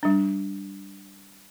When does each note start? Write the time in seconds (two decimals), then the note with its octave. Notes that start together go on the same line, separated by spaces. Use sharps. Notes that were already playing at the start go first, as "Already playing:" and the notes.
0.03 G3 D4